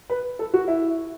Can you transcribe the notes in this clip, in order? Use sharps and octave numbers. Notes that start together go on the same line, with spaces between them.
B4
A4
F#4
E4